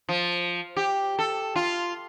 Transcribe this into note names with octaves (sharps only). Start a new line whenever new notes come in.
F3
G4
A4
F4